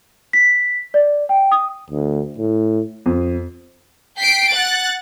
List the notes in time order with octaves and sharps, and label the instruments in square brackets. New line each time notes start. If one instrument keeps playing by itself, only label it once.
[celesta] B6
D5
G5
D#6
[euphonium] D2
A2
[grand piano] F2
[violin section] G5 B6 C7 D7
F#5 F#6 A6